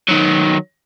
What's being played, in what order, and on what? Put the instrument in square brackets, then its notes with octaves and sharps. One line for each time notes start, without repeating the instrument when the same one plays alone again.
[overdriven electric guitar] D#3 F#3